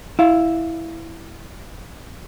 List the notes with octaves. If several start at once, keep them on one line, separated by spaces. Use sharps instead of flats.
E4 F5